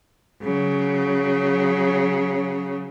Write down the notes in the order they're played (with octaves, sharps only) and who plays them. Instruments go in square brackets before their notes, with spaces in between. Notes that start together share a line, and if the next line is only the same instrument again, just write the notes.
[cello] C#3 F#3